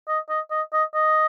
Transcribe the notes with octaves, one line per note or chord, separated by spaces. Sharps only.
D#5
D#5
D#5
D#5
D#5